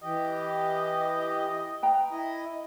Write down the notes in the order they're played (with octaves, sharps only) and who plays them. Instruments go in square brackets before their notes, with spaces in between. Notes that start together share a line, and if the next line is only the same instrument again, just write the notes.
[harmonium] E3 G4 [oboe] D#5
[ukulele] B4 G5 A#5
[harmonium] E4 D#5